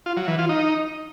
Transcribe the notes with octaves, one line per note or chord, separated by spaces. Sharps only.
F4
F#3
E3
F4
D#4